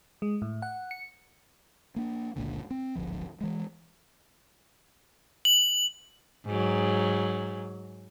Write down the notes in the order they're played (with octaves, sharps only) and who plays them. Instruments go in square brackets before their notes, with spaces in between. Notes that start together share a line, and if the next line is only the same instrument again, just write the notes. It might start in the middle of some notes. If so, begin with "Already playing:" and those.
[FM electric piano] G#3
A2
F#5
C#7
[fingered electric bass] A#3 D4
F#1 C#2 A#2 D3
C4
D1 G#1 D2 F3
E3 G#3
[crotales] F#7
[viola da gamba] G#2 F#3